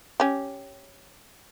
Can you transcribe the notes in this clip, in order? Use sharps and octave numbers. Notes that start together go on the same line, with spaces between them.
C#4 G4